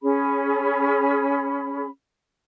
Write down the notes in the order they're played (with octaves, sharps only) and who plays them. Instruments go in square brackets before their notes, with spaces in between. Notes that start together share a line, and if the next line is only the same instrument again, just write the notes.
[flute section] C#4 G#4 B5